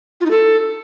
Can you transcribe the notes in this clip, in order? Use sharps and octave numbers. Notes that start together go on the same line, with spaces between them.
F4
D#4
A4